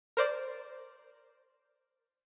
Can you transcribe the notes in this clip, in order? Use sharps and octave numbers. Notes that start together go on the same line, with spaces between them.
A#4 C5 D5